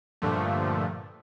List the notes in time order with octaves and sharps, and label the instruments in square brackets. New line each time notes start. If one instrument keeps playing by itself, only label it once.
[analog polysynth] G2 A#2 D3 F3 A3